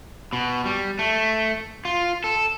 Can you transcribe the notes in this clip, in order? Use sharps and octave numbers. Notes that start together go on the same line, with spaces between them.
B2
G3
A3
F4
A4